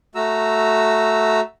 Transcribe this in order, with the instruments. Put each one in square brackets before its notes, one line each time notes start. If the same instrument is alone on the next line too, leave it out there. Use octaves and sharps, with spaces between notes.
[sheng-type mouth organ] A3 F#4 A#5 E6